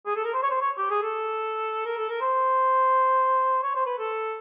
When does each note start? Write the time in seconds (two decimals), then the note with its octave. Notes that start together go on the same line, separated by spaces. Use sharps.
0.06 G#4
0.16 A4
0.24 A#4
0.34 C5
0.43 C#5
0.51 C5
0.61 C#5
0.78 G4
0.90 G#4
1.02 A4
1.85 A#4
1.97 A4
2.09 A#4
2.21 C5
3.63 C#5
3.76 C5
3.86 B4
3.99 A4